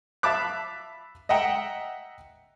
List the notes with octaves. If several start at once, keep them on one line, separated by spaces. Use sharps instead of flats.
E5 F5 A5 B5 D6 F#6
D#5 E5 F#5 G5 A#5